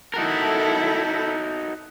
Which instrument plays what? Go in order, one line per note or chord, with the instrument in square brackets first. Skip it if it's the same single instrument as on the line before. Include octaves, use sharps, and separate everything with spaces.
[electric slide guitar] D#4 F#4 A#4 [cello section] E4 A4